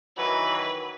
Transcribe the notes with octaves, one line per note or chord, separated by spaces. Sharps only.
D#3 E3 F#3 B4